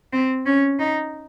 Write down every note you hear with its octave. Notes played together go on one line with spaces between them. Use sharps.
C4
C#4
D#4